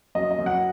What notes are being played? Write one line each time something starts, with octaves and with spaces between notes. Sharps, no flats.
F#2 D#5
D#5
F#2
F#5